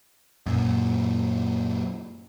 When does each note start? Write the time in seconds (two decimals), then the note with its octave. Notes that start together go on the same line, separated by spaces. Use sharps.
0.46 F#2 A#2